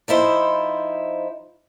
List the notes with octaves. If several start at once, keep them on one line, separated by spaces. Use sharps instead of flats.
F3 D#4 E4 C5